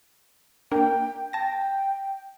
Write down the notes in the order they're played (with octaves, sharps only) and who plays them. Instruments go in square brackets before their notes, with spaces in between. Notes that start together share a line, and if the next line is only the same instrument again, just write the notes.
[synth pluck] A#3 D4 A#4 [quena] G5
[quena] G5 [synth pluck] A5 A#6